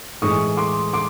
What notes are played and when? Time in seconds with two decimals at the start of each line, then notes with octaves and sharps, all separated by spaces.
0.22 A2 E3 G#3 C#6 D#6
0.57 C6 D6
0.93 C6 D6